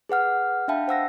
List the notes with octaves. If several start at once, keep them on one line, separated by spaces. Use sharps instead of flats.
G#4 B4 F#5 F6
D4 E5 F5 G5 A5 B5
C5 F#5 E6 A#6